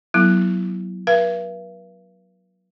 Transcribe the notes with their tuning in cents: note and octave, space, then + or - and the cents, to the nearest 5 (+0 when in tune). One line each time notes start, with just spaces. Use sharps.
F#3 +0 B3 -30 E4 +0
B4 -40 E5 +45